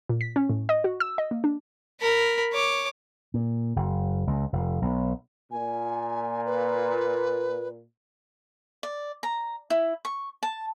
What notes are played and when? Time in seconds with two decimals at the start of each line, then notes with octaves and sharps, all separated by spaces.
0.09 A#2
0.21 B6
0.36 C#4
0.49 A2
0.69 D#5
0.84 F#4
1.00 E6
1.18 D#5
1.31 A#3
1.44 D4
2.01 A#4 B5
2.53 C#5 D6
3.34 A#2
3.76 F#1
4.27 C#2
4.53 F1
4.82 B1
5.51 A#2 G#5
6.46 B4
8.83 D5
9.23 A#5
9.70 E4
10.05 C#6
10.43 A5